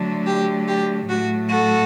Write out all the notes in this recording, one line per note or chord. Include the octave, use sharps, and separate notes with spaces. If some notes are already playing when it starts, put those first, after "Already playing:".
Already playing: D3 F#3 A3
G4
G4
A2 F#3 A3 F#4
F#4 A4